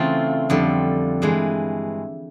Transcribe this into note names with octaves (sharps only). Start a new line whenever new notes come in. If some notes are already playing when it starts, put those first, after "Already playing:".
Already playing: C#3 E3 A3 C4 F4
F2 D3 G3
G2 E3 G#3